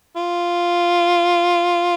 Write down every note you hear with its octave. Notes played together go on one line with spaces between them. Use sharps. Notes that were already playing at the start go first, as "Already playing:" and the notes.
F4